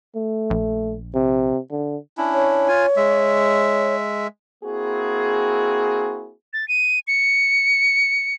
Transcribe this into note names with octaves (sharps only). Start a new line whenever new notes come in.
A3
A#1
C3
D3
C#4 D4 E4
C#5
F4 G#5
G#3 E5
A#3 C4 E4 F#4 G#4
A6
D#7
C#7